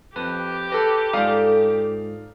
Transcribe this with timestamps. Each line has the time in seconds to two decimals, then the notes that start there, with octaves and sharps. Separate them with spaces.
0.16 F2 G4 B4
0.72 A4 B4 A#6
1.13 G#2 F4 A4 D5 F5 A#5 D#6